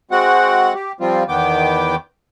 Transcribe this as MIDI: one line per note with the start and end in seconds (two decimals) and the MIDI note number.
0.11 0.73 56
0.11 0.73 60
0.11 0.73 66
0.11 0.73 78
0.74 0.92 67
1.00 1.23 53
1.00 1.23 55
1.00 1.23 60
1.00 1.23 65
1.28 1.95 40
1.28 1.95 51
1.28 1.95 59
1.28 1.95 79
1.28 1.95 86